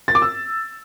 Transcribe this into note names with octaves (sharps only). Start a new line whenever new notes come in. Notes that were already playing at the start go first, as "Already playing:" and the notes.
A6
D6
E6